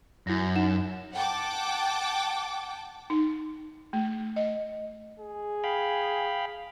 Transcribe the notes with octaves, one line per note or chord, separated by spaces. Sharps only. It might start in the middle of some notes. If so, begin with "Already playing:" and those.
F#2 E4 A#6
D#4 F#5 E7
F#5 G5 A5 D6
D#4
A3
D#5
G#4
F5 G5 B5